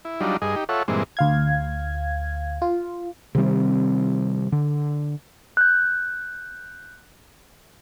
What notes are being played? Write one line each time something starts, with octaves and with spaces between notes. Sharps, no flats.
E4
F#3 G3 D4 D#4 F4
G2 G#4 D#5
D#4 G4
F4 A4 C#5 E5 F#5
G2 A#2 E3 G#3 C4
D2 F5 G#6
F4
C3 D#3 G3 C4
D3
F#6 G6